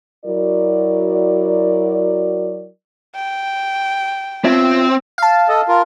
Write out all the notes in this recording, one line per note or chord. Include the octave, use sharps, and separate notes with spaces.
F#3 E4 F#4 A#4 D5
G5
C4 F4 C#5 E5
F5 A5
A4 D#5
F4 A#4